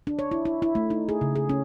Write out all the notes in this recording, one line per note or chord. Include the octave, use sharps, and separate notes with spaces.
D4
C#5
E4
E4
E4
A3
D#4
G#4
C#3
G#4
C#4